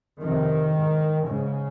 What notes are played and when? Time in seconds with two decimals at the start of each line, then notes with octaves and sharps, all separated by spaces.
0.23 F2 C3 D#3
0.76 G#2
1.28 G#2 C#3